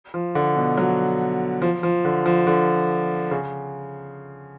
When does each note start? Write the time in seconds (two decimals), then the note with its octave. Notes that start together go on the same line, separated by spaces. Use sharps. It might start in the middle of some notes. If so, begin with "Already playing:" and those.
0.14 F3
0.35 D3
0.57 B2
0.78 F#3
1.62 F3
1.83 F3
2.05 D3
2.26 F3
2.47 D3
3.31 C#3